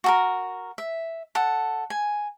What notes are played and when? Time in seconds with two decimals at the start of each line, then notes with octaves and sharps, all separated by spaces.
0.04 F#4 A4 A#4
0.78 E5
1.35 A4 F#5
1.90 G#5